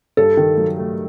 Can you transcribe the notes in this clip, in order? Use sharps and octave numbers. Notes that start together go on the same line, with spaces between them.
G2 A4
D#3
F#3
A3